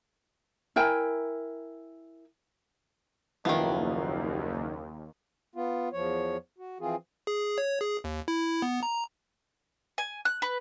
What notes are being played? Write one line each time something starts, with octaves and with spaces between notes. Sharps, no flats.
E4 A#4 G5 G#5
F#1 D#2 D#3 F3 B3 E4 F5
B3 F4
E2 F3 C#5
F#4
E3 F3 C4 F4 G#4
G#4
C#5
G#4
D#2
E4
B3
A#5
G#5
F#6
B4